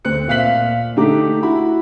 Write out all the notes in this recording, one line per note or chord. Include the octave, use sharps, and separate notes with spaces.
D2 C4 F#6 C#7
A#2 E5 F5 F#6 B6 F#7
D3 A3 D#4 G4 A#5 D6
E4 F#4 B5